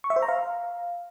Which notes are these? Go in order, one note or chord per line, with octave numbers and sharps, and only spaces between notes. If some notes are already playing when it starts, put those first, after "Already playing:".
C#6
E5
C5
A#5
F5